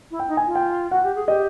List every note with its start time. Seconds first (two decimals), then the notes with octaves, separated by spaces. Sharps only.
0.11 E4
0.20 G5
0.28 D#4
0.37 G#5
0.47 F4
0.55 G5
0.91 F#4 F#5
1.03 G4
1.15 G#4
1.28 G4 D#5